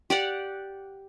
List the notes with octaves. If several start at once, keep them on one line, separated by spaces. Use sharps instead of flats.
G4 D5 F#5